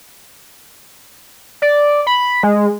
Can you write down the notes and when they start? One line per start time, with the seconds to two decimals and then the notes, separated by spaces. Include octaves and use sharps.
1.62 D5
2.07 B5
2.43 G#3